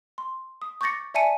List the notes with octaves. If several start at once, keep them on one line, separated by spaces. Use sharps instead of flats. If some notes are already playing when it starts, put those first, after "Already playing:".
C6
D#6
C#6 D6 G6 A6 A#6 C#7
D5 E5 G#5 A5 C#7 D#7